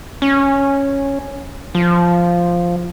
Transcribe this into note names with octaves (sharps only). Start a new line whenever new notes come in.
C#4
F3